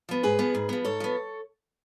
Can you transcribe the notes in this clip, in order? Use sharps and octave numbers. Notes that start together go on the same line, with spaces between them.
F3 B3
G#2 G#4 B4
F3 B3
G#2
F3 B3
G#2 A4 C#5
F3 B3